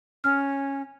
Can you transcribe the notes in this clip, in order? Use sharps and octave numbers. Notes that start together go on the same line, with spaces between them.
C#4 F6